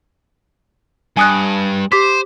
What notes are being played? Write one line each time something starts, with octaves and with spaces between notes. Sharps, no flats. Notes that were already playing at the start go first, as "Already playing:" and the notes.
G2 G#5 D#6 F#6
G4 C5 D6 B6